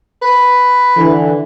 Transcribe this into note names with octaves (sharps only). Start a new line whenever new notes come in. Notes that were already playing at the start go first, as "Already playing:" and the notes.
B4
D3 E3